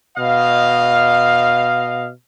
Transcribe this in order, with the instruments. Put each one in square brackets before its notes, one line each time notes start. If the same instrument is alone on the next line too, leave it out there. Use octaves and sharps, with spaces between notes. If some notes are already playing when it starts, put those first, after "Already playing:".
[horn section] B2 D#5 F5